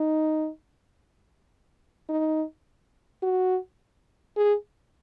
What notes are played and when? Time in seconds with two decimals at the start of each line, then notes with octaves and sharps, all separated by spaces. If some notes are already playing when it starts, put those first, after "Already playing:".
Already playing: D#4
2.09 D#4
3.23 F#4
4.37 G#4